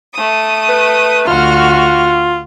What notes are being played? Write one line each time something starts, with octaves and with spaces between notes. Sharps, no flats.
A3 D#6
B4
D2 F4 F#4 F6